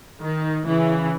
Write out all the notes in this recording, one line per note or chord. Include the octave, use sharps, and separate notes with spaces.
D#3
C#3 E3